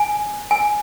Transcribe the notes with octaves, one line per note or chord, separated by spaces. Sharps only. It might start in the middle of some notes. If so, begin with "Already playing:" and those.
Already playing: G#5
G#5